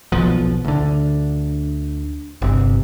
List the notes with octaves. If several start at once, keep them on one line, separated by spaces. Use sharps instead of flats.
D#1 B1 B2 F3
D2 D3
G1 C3